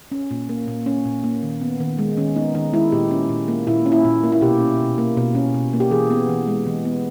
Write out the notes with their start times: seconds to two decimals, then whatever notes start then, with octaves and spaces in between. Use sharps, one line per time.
0.12 C#4
0.31 A#2
0.49 A#3
0.68 A#2
0.86 C#4
1.05 A#2
1.24 A#3
1.43 D#3
1.61 B3
1.80 D#3
1.98 G#3
2.17 D#3 C#4
2.36 B3 D#4
2.55 D#3 D#4
2.73 G#3 E4
2.92 A#2 G4
3.11 C#4
3.29 A#2
3.48 A#3
3.67 A#2 E4
3.86 C#4
3.92 E4
4.05 A#2
4.23 A#3
4.32 E4
4.41 B2 G4
4.60 C#4
4.79 B2
4.98 A#3
5.17 B2
5.35 C#4
5.54 B2
5.73 A#3
5.80 G4
5.91 E3 G#4
6.10 B3
6.29 E3
6.47 G#3
6.66 E3
6.85 B3